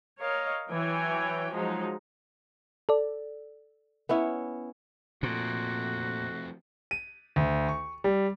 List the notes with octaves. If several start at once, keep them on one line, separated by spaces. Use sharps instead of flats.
A#4 C#5 D#5 F5
E3 F#3 C#5 G5 G#5
F3 F#3 G#3 D#4
A4 D5
B3 C#4 E4
A#2 F3 A3 C4 F#4
D#7
D2
C#6
G3